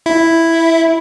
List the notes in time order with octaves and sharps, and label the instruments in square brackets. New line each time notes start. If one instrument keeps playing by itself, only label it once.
[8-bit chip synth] E4